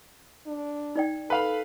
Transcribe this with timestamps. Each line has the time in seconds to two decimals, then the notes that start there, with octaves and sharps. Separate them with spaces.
0.47 D4
0.96 D#4 D5 G5
1.30 A4 B4 F5 B5